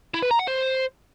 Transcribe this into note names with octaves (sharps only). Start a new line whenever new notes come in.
E4
B4
A#5
F#5
C5